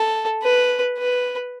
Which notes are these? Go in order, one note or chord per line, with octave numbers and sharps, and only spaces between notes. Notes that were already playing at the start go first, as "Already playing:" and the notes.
Already playing: A4
B4
B4